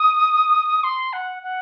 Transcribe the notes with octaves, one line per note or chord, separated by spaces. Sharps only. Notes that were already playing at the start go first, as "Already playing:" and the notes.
Already playing: D#6
C6
F#5
F#5